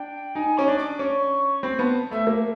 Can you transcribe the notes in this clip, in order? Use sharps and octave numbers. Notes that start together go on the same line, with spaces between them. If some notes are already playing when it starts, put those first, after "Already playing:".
Already playing: D4 G5
D#4 G#5
C#4 D6
D4
D6
C#4 C#6
C4 B5
B3 A5
A3 E5
A#3